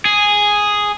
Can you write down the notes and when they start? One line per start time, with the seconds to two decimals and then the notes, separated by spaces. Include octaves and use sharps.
0.05 G#4